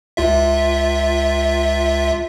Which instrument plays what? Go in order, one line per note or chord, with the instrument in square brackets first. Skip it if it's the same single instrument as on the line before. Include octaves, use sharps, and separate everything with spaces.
[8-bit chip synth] C#2 F4 E5